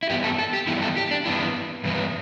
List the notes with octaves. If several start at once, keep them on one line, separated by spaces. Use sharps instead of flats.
E4
G2 E3 B3 G4
A4
A4
G4
G2 E3 B3 E4
A4
G4
D4
G2 E3 B3 E4
G2 E3 B3